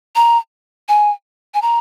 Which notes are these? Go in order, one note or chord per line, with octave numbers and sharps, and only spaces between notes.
A#5
G#5
G#5
A#5